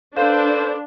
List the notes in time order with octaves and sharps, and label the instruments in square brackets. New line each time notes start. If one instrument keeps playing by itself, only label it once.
[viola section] D4 [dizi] A4 [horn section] B4 C5 [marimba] F5